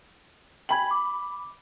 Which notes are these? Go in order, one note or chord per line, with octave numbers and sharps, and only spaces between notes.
G5 G#5 B5 G#6 F#7
D6